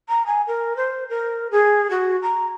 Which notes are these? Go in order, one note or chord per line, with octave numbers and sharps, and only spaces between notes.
A#5
G#5
A#4
C5
A#4
G#4
F#4
A#5